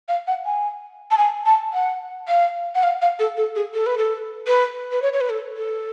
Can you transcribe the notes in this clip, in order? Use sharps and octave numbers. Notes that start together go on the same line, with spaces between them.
F5
F#5
G#5
A5
G#5
A5
F#5
F5
F#5
F5
F5
A4
A4
G#4
A4
B4
A4
B4
B4
C#5
C#5
B4
A4
A4